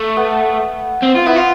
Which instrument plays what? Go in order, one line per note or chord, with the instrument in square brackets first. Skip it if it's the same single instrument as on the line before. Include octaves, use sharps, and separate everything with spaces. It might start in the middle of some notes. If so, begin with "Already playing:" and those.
Already playing: [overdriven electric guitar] A3
[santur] B3
[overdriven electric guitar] C4
F4
[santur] B3 [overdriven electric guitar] E4
[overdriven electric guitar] F4